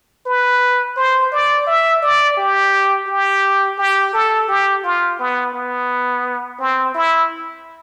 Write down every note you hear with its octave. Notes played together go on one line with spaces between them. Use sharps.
B4
C5
D5
E5
D5
G4
G4
G4
A4
G4
F4
B3
B3
C4
E4